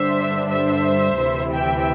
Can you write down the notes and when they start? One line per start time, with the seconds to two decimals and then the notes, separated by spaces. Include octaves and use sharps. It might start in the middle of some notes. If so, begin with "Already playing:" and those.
Already playing: G2 D3 G3 D4 C5 E5
0.49 C5 E5
1.18 D2 C3 E3
1.52 E5 G5